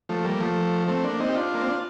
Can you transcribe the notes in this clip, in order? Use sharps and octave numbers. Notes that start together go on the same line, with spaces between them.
F3 A3
G3 A#3
F3 A3
A3 C4
A#3 D4
C4 D#4
G4
D4 F4
A#3
C4
D4